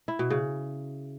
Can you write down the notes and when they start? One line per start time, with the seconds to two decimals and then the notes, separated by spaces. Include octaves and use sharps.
0.08 E4
0.19 B2
0.30 C#3